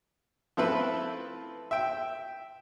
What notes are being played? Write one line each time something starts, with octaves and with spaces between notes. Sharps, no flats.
F3 A3 C4 E4 A4 B4
E5 G5